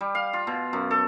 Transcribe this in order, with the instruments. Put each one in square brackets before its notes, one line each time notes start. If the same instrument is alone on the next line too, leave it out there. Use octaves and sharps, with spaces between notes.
[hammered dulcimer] G3
F5
F4
B2
F#2
A4